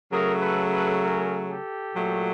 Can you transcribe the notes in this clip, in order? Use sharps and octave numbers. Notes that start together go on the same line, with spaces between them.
C#3 F#3 A3 G#4 A#4
A4 B4
A4 B4
G#4 A#4
G4 A4
A#2 F#3 A3